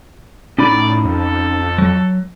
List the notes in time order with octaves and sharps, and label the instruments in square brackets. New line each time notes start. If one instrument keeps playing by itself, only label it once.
[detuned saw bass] A2 [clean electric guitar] C#4 D#4 B5 [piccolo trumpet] D5
[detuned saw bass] F2 [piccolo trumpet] A4
[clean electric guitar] F#3